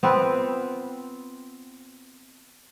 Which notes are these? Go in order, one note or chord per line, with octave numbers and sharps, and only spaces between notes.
B3 C4 F4 B4